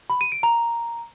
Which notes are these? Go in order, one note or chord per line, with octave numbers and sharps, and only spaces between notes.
B5
D#7
D7
A#5